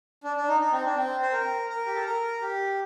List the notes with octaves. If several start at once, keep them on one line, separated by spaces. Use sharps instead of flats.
D4
D4
D#4
D#4
C4
D4
C4
C5
A#4
A#4
G4
A4
A#4
G4